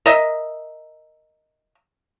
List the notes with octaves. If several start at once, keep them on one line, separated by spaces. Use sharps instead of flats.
A#4 D#5 E5